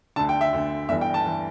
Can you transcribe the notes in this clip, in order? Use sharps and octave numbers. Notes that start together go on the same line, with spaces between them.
D2 D3 A5
G5
E5
D2 D3
G1 G2 E3 E5
G5
A5
E3